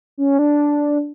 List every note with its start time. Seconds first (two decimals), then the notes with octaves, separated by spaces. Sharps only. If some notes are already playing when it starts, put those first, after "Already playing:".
0.18 C#4
0.39 D4